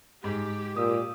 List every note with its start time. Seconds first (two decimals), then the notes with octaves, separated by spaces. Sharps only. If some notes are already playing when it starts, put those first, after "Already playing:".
0.24 G#2 G#3 G4
0.77 A#2 D#6 E6